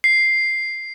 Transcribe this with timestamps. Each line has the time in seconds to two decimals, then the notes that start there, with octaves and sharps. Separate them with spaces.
0.04 C7